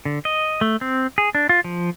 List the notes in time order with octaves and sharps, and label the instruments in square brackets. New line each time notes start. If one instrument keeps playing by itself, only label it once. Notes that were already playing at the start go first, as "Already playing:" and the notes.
[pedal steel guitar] D3
D#5
A3
C4
G#4
D4
F4
F3